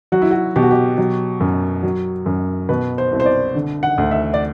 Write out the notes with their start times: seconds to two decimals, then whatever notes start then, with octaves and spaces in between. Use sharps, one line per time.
0.12 F#3 F#4
0.22 E4
0.31 F#4
0.56 B2 G4
0.63 F#4
0.71 G4
0.98 F#3
1.40 F#2
1.83 F#3
2.26 F#2
2.69 B2 B4
2.98 C5
3.12 C2
3.20 C5
3.26 D5
3.55 D3
3.83 F#5
3.98 D2
4.11 E5
4.34 D5